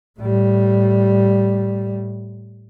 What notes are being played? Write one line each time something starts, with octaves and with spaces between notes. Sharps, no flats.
A2 G3